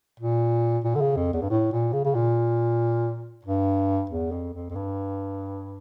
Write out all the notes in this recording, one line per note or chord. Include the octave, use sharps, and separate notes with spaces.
A#2
A#2
D3
C#3
F2
E2
G2
A2
A#2
C#3
C#3
A#2
G2
E2
F2
F2
F2
G2